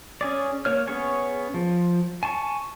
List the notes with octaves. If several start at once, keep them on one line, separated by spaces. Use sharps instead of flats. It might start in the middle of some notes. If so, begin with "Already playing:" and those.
C#4 G#4 D5
A#3 C#5 F6
B3 C#4 G#4 C#5 G#5
F3
G#5 A5 C6 C#6